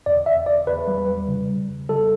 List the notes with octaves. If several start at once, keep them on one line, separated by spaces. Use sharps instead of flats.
E2 D5
E2 E5
E2 D5
E2 B4
G3
G3
C#3
C#3
E2
G3 A4